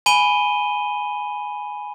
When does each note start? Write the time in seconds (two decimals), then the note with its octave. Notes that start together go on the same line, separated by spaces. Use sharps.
0.06 G#5 B5 D#7 G7